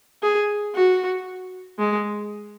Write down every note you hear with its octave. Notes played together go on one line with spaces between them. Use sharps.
G#4
F#4
G#3